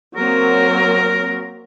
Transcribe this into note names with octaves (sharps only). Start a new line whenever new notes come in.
F#3 A#3 C4 A#4